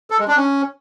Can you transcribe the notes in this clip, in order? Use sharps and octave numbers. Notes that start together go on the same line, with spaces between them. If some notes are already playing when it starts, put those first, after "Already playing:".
A4
G#3
D4
C#4